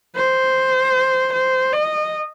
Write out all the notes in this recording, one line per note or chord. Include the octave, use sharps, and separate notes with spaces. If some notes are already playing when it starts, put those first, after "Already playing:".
C5
C5
D#5